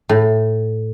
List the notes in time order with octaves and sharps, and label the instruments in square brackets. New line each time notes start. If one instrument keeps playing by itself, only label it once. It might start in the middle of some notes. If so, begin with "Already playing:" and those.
[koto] A2